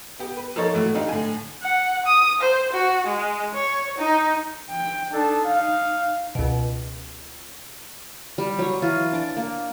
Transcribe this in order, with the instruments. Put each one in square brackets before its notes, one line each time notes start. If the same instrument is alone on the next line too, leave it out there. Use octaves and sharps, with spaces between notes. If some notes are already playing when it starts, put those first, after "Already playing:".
[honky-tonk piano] B3 G4
B4
F3 A#3 D#4 A4 C#5 A6
A2 E3 F#3 A3
C4 D4 D#4 F4 G4
A2 D3 G#5
[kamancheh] F#5
D#6
C5
F#4
G#3
C#5
D#4
[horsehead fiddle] G5
[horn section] D4 A4 A5 [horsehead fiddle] D#4
[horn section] F5
[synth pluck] C#2 B2
[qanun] G3
F#3 C#5
E3 F4
D4 D6
A#3